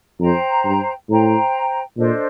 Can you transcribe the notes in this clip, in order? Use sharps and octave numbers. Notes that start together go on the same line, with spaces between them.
F2 C5 G5 A#5
G2
A2 C5 G5 A#5
A#2 D4 A4 C5 D#5